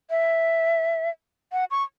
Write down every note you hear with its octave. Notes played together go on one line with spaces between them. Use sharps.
E5
F#5
C#6